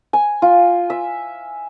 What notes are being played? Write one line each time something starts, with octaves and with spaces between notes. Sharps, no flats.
G#5
F4
E5